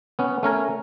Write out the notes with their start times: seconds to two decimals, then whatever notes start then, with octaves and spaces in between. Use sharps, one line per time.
0.19 B3 C#4
0.43 A3 C#4 A#4 G#5